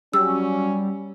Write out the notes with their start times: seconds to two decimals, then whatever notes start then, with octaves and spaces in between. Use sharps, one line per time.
0.14 F#3 G3 C#4 E6